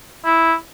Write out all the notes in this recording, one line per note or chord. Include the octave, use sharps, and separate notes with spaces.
E4